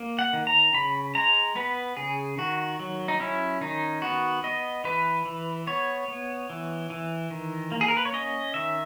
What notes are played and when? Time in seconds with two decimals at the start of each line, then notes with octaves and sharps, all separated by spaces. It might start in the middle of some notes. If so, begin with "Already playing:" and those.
Already playing: A#3
0.19 F#5
0.33 D#3
0.47 A#5
0.73 C#3 B5
1.15 G#3 A#5
1.55 B3 B4
1.97 C#3 G#4
2.38 D#3 F#4
2.80 F#3
3.08 D#4
3.20 C#4 E4
3.61 D#3 D#4
4.02 B3 F#4
4.43 B3 D#5
4.84 E3 B4
5.25 E3
5.67 B3 C#5
6.08 B3
6.50 E3
6.90 E3
7.31 D#3
7.72 A#3
7.81 G#4
7.88 A#4
7.97 B4
8.05 C#5
8.13 C#4 D#5
8.54 D#3 E5